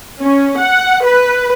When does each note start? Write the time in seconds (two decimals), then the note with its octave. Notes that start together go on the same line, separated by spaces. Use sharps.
0.19 C#4
0.58 F#5
1.03 B4